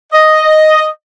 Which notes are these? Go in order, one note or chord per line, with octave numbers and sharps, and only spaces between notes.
D#5